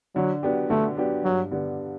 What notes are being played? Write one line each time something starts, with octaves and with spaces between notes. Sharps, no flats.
D3 F#3
F#3 B3 D4 G4
D3 A3
F#3 B3 D4 G4
G2 F#3
D3 G3 B3